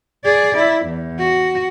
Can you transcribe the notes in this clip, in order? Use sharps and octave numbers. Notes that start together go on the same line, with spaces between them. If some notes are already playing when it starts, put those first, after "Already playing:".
G#4 D5
E4
E2
F#4